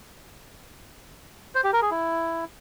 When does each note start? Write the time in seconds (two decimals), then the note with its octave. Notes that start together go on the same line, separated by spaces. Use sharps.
1.55 C5
1.64 G4
1.73 A#4
1.82 G#4
1.91 E4